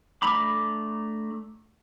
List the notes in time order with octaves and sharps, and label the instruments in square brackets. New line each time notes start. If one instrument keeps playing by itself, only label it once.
[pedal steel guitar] A3 D4 A#5 B5 D6